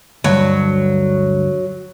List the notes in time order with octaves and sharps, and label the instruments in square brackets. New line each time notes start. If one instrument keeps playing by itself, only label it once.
[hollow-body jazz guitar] D2 G2 [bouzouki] F#3